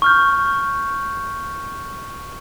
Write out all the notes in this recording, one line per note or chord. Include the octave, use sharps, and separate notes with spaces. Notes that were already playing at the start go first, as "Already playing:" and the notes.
C#6 F6 G6